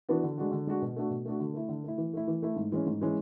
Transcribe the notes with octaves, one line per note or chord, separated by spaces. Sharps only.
E3 B3 D4 F#4
D3
G#3 D4 F#4
D3
G#3 D4 F#4
B2
A3 D4 F#4
B2
A3 D4 F#4
D3
A3 E4
D3
A3 E4
E3
A3 E4
E3
A3 E4
G#2
E3 G#3 C#4
G#2
E3 G#3 C#4